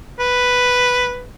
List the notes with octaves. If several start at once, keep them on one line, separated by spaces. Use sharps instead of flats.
B4